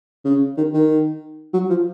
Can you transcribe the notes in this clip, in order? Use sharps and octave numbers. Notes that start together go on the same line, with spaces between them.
C#3
D#3
D#3
F#3
F3